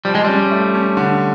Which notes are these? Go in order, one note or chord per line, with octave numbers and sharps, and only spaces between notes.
F3 G3
G#3
G3 C#4
A3
C#4
D3